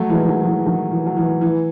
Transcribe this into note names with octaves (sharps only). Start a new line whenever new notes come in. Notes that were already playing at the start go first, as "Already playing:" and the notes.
Already playing: F#3 A3
E3 G#3
E3
D#3 F#3
F#3
E3
D#3 F#3
E3
F#3
E3
E3